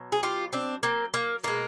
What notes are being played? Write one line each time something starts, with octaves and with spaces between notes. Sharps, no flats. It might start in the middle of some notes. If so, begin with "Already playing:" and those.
Already playing: B2 F#3
G#4
F4 G4
C4 D4
A#3 C4
A#3
B2 G#3 A#3